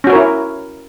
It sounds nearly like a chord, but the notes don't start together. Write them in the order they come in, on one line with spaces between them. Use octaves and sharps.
C#4 F#4 C#5 A#4 E4